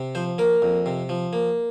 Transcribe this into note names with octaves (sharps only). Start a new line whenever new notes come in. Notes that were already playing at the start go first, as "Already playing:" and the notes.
Already playing: C3
F3 C5
A#3 A#4
F2
C3
F3
A#3